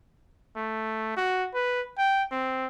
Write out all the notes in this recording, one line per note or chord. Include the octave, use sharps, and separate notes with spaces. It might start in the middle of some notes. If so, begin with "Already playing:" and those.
A3
F#4
B4
G5
C4